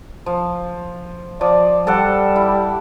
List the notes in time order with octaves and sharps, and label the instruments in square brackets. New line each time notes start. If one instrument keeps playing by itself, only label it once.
[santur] F3
[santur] F3 [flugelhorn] D5
[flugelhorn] G3 [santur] A4 D5 F#5
[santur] E4